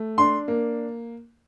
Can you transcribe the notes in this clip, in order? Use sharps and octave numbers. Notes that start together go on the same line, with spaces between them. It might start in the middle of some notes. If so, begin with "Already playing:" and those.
Already playing: A3
D4 C6
A#3